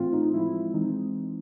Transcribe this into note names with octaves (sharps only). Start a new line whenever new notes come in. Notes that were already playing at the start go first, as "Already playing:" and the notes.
Already playing: A2 E3 A3 C4 F4
D#4
F3 G#3 C4 E4
E3 G#3 C4 D#4